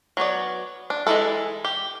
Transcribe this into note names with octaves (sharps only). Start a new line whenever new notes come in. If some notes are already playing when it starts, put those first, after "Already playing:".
F#3 B3 C#5 D5
D4
E3 G#3 A#3 E4 A4
G4